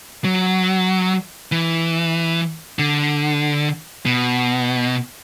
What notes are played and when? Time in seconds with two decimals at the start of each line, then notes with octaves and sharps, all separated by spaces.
0.24 F#3
1.52 E3
2.79 D3
4.06 B2